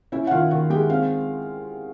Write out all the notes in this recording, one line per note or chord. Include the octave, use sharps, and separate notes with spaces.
C#4 E4 E5
F#5
D#3 F4 F5
D#3 F#4 F#5
G#3 G4 G5
C4 F5